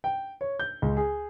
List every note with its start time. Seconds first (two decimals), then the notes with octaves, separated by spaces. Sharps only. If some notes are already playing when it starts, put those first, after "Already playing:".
0.04 G5
0.41 C#5
0.59 G6
0.82 C#2
0.97 G#4